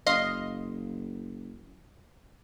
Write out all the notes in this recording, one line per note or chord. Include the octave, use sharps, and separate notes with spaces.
F#1 D#5 F5 C6